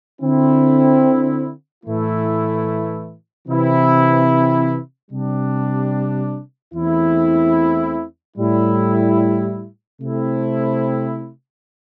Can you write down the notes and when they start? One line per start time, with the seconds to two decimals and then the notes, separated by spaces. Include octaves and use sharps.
0.21 D3 C4 E4
1.84 A2 E3 A3 E4
3.48 C3 E3 C4 E4
5.11 C3 G3 D4
6.74 E2 E3 A3 C4 E4
8.37 A2 G3 E4
10.00 C3 A3 C4 E4